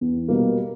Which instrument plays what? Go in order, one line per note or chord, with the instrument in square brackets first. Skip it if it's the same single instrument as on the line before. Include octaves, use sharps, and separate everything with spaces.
[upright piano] E2
B2 G3 A#3